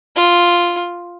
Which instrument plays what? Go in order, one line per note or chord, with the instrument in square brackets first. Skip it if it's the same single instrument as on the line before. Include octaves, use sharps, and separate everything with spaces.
[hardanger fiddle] F4